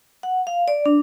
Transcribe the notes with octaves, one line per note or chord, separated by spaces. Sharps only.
F#5
F5
D5
D4